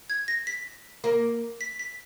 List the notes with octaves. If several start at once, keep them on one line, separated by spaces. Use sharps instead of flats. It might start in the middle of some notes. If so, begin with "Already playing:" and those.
G#6
A#6
B6
A#3
B6
B6